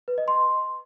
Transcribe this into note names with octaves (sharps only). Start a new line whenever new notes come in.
B4
D#5
C6